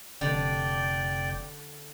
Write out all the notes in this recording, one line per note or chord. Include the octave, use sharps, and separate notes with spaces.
F1 D3 D5 G5